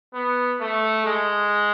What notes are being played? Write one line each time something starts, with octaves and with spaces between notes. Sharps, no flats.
B3
A3
G#3